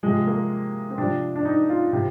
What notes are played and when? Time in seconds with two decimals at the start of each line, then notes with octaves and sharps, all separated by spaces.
0.03 C3 F3 G#3
0.26 A#3
0.90 C4
0.98 C3 F3 D4
1.36 D4
1.45 D#4
1.69 F4
1.93 C3